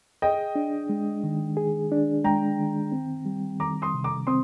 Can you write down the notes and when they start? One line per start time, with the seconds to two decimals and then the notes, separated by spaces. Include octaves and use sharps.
0.22 G#4 D#5 G5
0.55 D4
0.89 G#3
1.24 D#3
1.57 G#4
1.92 D4
2.24 G#3 G5 A#5
2.59 D#3
2.92 C4
3.26 G3
3.59 D#3 A#5 D6
3.82 C6 D#6
3.94 C3
4.04 A#5 D6
4.27 C4 C6 D#6